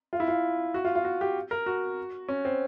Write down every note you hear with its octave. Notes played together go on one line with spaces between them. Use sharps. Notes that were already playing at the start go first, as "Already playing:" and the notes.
F4
E4
F4
F#4
F4
F4
F#4
G4
A#4
F#4
C#4
C4